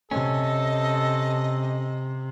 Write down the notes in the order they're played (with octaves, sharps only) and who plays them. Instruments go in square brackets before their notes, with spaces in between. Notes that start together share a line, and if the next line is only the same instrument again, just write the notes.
[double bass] C3 [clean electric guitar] C#4 [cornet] A4 [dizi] D#5